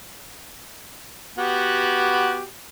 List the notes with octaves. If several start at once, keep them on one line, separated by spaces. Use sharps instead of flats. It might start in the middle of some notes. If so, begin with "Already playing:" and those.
B3 F#4 G4